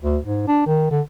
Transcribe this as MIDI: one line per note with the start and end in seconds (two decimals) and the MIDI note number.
0.02 0.18 38
0.24 0.47 44
0.47 0.66 62
0.66 0.90 51
0.91 1.01 50